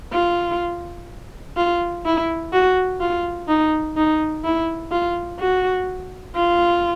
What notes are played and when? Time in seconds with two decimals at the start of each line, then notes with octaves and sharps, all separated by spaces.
0.13 F4
1.57 F4
2.06 E4
2.53 F#4
3.01 F4
3.48 D#4
3.97 D#4
4.44 E4
4.92 F4
5.39 F#4
6.36 F4